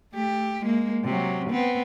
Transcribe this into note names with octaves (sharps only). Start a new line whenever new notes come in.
A3 G4
G#3 A#3
C3 F#3
B3 C4